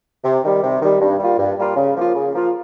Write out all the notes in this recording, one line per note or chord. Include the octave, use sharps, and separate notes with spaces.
C3
D#3 G3
C3
D#3 G3
G2
G3 A#3 F4
G2
G3 A#3 F4
C#3
F3 A#3 F4
C#3
F3 A#3 F4